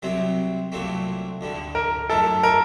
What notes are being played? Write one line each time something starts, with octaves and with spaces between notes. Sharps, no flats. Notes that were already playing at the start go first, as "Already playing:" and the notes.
C2 C3 F#3 C4
C2 A#2 F#3 A3 C4
D2 D3 G3
A#4
F#2 D#3 A3 A4
A#4